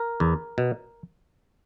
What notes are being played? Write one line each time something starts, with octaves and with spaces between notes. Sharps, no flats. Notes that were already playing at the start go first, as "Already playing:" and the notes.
Already playing: A#4
E2
B2